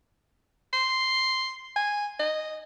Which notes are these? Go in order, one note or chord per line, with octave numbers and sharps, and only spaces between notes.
C6
G#5
D#5